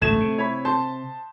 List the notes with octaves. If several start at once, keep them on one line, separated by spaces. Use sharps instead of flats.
A1 D2 G#2 A3 G#6 E7
C3
E4 C#5 B5
A5 C6 G6